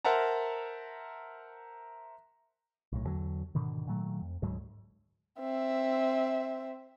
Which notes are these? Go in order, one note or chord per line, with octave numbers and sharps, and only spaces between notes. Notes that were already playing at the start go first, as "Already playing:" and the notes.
A#4 C5 E5 F#5 A5 A#5
B1 A2
E2 D3 F#3
G#2 B2 D3 D#3
A#2 D#3 F#3 A3
F2
D2 G#2 F#3 G#3
C4 E5